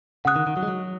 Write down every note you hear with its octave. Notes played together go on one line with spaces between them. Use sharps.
C#3 F#5 D#6 F#6
D#3
D#3
F#3
G#3
F#3